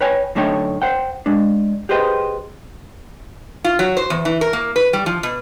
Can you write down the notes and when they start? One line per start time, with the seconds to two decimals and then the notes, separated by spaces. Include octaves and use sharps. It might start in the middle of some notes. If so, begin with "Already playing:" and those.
0.01 B4 C#5 G5 G#5
0.35 F#2 D3 A3 D#4 C#5 G5
0.82 C5 F#5 G5
1.26 G#3 D4
1.89 G4 G#4 B4 C5 D#5 G5
3.64 F4
3.79 F#3
3.97 C5
4.10 E2
4.25 E3
4.41 A#4
4.53 A#3
4.76 B4
4.93 G3
5.06 F3
5.23 B2